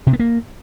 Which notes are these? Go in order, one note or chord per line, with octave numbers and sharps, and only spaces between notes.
C3
B3
A#3